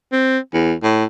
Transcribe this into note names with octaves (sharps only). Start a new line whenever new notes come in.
C4
E2
A2